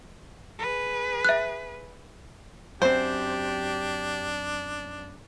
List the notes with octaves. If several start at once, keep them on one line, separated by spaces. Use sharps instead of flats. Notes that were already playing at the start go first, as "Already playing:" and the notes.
G#4 B4
E5 F#6
F#2 C4 D4 G4 C5